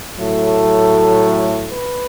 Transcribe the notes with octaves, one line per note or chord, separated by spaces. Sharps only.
A2 F#3 A3 A4
B4